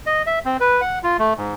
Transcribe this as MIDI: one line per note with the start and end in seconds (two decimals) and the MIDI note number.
0.06 0.22 75
0.27 0.39 76
0.45 0.57 60
0.60 0.81 71
0.81 0.99 78
1.03 1.17 65
1.19 1.34 57
1.37 1.54 44